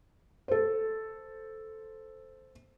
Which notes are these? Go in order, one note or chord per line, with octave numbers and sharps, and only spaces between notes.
A4 C5